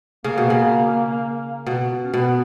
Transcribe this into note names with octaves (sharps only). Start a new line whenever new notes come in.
C#3 A#3
B2
C#3
B2
C#4
B2 B3